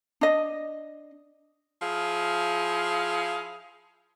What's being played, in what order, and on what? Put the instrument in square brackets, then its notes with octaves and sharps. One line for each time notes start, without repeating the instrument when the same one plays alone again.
[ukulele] D4 D#5
[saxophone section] F3 E4 G#4 F5